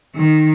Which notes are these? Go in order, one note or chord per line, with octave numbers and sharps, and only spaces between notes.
D#3